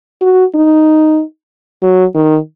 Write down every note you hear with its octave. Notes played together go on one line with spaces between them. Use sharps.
F#4
D#4
F#3
D#3